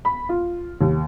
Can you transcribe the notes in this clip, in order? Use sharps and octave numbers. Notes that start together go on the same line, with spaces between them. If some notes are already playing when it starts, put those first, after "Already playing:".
B5
F4
D#2